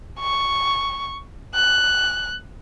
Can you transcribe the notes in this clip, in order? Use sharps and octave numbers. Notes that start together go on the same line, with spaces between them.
C#6
F#6